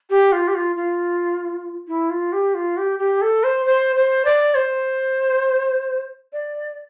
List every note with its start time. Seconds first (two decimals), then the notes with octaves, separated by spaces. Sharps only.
0.10 G4
0.32 F4
0.48 G4
0.55 F4
0.76 F4
1.88 E4
2.10 F4
2.33 G4
2.54 F4
2.77 G4
2.99 G4
3.22 A4
3.44 C5
3.66 C5
3.96 C5
4.25 D5
4.55 C5
6.33 D5